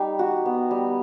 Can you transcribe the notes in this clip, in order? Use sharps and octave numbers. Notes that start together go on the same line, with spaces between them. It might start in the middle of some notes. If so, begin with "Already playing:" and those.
Already playing: G3 D#4
F#4
B3
G3